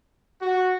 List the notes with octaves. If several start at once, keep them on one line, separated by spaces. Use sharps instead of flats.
F#4